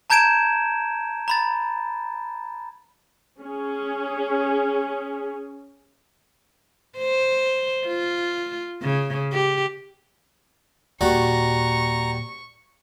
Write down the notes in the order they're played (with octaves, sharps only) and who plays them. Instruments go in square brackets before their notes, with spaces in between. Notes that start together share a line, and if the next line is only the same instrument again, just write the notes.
[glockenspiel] A5 A#5 G6 G#6 D7 E7
A#5 B5 A6
[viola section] C#4 G#4
[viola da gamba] C5
F4
C#3
G4
[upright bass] D#2 A#2 [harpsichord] G3 F#4 [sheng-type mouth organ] A#5 [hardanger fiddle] C#6